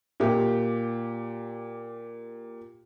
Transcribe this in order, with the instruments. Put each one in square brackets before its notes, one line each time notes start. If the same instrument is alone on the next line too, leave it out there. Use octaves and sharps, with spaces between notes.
[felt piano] A#2 G4